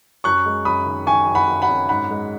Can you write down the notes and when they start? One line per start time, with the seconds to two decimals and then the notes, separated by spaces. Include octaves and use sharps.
0.24 F#2 C#6 F#6
0.46 G#3
0.65 F#2 B5 D#6
0.86 D#3
1.07 D#3 G#5 C#6
1.27 F#2
1.35 F#5 B5
1.48 F#2
1.62 F#5 B5
1.69 F#2
1.89 G#2 F#5 B5
2.10 G#3